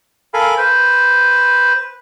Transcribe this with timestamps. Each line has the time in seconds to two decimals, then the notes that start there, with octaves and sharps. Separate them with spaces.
0.34 A4 A#4 F5 G#5 B5
0.57 B4 C5